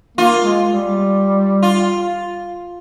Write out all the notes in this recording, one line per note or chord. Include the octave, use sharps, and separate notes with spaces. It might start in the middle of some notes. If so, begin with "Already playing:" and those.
A#3 F4
G#3
G3
F4